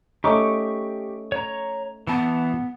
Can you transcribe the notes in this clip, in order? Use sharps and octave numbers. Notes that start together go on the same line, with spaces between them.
A3 C#4 D#4 G4 C#6 D6
C#5 A#5
E3 B3 A5